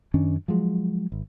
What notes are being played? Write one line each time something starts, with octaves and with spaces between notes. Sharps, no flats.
F#2 D#3 C#4 D4
F3 F#3 G#3
G#1